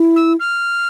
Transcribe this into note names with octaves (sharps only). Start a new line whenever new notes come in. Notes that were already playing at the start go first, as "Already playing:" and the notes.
Already playing: E4
E6
F6